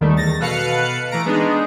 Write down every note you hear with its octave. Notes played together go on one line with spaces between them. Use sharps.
D#2 D#3 G3 A3
E2 A6 A#6
B2 A4 B4 F5 F#6 C#7
E3 A3 A#5 D7
G#3 B3 D4 D#4 G#4